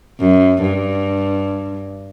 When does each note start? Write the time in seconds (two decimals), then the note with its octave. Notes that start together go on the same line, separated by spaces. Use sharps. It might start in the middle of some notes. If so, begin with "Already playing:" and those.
0.19 F#2
0.62 G2